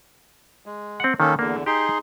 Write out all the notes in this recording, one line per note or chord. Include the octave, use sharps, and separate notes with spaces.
G#3
C4 F#5
D#3 A#3 C#4 A4
E2 D3 A#3
D#4 G4 G#4 C6